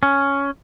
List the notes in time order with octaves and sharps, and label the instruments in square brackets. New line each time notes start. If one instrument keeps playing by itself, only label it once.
[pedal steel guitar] C#4